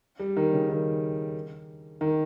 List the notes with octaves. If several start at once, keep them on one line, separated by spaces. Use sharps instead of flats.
G3
D#3
C#3
D#3
D#3